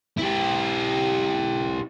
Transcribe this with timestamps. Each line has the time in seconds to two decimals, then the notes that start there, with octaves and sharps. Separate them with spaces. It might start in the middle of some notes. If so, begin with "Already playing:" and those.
0.17 E4 G4